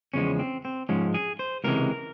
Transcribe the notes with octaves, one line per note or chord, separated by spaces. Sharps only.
E2 C#3 F3 G#3 C#4
C4
C4
G#2 F3 G#3 C#4
G#4
C5
C#2 C3 E3 G#3 A#4